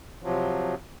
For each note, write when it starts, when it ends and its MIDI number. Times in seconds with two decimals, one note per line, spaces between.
0.23 0.75 48
0.23 0.75 53
0.23 0.75 54